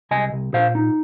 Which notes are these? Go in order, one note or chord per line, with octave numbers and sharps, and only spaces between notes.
C2 D#5 G#5
C2
A#2 C5 F5
D#4